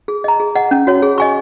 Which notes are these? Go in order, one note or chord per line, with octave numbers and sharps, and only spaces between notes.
G#4
D#5 A#5
G#4
D#5 F#5
C#4
F#4 C#5
G#4
D#5 G#5 C#6